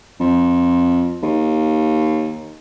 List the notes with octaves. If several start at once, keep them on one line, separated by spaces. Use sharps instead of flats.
F2
D#2